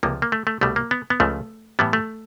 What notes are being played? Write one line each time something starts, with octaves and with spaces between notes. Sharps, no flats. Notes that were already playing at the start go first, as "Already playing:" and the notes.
C#2 C3 F3 A#3
A#3
A3
A3
C2 B2 G3 A3
A#3
B3
B3
C#2 C#3 F3 A3
A2 E3 G3 B3
A3